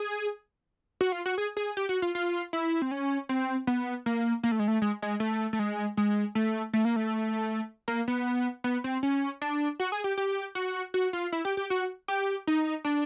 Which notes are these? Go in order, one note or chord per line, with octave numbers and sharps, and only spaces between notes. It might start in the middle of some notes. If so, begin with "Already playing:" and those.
Already playing: G#4
F#4
F4
F#4
G#4
G#4
G4
F#4
F4
F4
E4
C4
C#4
C4
B3
A#3
A#3
A3
G#3
A3
G#3
G#3
A3
A3
G#3
G#3
A3
A3
A#3
A3
A#3
B3
B3
C4
C#4
D4
F#4
G#4
G4
G4
F#4
F#4
F4
E4
G4
G4
F#4
G4
D#4
D4